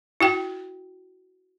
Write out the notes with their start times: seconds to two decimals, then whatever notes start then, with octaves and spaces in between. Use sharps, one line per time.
0.21 E4 F#4 G5